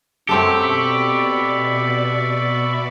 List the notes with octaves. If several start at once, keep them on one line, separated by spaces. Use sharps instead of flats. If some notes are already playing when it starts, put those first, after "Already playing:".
F#2 A3 C4 G4 A4
B2 D5 E5 B5 C#6